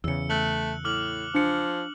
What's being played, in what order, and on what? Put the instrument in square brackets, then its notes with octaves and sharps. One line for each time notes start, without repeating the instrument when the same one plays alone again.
[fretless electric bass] E2 C#3 [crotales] E6 C#7
[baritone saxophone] A3 [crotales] F#6 C#7 F#7
[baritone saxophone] A2 [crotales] D6 F6 F#7
[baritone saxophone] F3 [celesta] D4 C#7